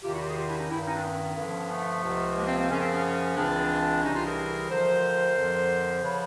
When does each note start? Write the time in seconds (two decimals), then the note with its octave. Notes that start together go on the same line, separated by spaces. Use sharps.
0.02 E2 C3 D#3 F4 G4
0.11 E4 F#4
0.19 F4 G4
0.27 F#4 G#4
0.36 F4 G4
0.46 D4 E4
0.58 C#4 D#4
0.69 G2 D#3 D4 E4
0.85 C#4 D#4
0.94 C4 D4
1.02 B3 C#4
1.36 G2 D3 F3
1.69 A3 B3
2.02 C#2 C3 F3
2.36 G#3 A#3
2.46 A#3 C4
2.58 A#3 C4
2.69 F#2 C#3 F3 C#4
2.80 C4
2.91 B3 C#4
3.36 C#2 C#3 E3 C4 D4
4.02 C2 C3 E3 C#4 D#4
4.13 D#4 F4
4.24 G#4 A#4
4.68 D2 D3 F3 A#4 C5
5.36 F2 D3 F3
6.02 C#3 F3 B4 C#5